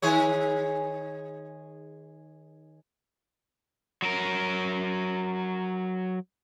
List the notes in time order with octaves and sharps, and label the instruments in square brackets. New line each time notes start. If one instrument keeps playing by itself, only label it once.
[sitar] D#3 G#4 C#5
[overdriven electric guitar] F#3 A#4